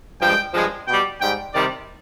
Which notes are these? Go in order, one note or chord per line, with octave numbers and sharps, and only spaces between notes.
G2 F3 G#3 G5
G2 F3 G#3
B2 G3 G5
G#2 G3 G5
C3 D#3 G3 D5